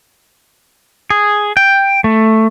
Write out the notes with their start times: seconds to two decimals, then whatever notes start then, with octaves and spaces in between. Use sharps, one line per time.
1.10 G#4
1.57 G5
2.04 A3